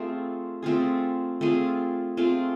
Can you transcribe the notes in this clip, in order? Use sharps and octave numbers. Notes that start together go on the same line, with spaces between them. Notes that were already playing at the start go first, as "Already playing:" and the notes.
Already playing: A3 C4 F4 G#4
A3 C4 F4 G#4
A3 C4 F4 G#4
A3 C4 F4 G#4